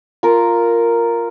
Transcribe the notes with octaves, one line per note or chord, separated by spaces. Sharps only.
F4 A#4